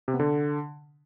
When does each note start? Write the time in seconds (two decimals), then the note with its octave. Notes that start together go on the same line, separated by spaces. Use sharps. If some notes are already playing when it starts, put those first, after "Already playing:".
0.08 C3
0.14 B3
0.20 D3